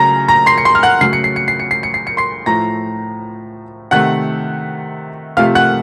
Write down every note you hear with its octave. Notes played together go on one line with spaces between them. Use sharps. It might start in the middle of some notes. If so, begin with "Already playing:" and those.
Already playing: C#3 F#3 A3 A#5 A#6
A#5 A#6
C6 C7
C#7
C6 C7
F6
F#5 F#6
C#3 F#3 A3 C7
C#7
C7
C#7
C7
C#7
C7
C#7
C7
C#7
C6 C7
A2 F3 A3 A#5 A#6
C3 D#3 A3 F#5 F#6
C3 F3 A3 F5 F6
F#5 F#6